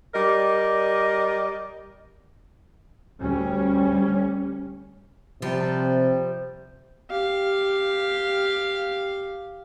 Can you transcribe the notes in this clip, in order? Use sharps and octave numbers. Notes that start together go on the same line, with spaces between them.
G3 A#4 D5 D#5
D2 G3 C#4
C3 F3 G3
G4 F5